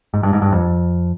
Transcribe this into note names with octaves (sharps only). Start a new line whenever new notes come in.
G#2
G2
G#2
G2
F2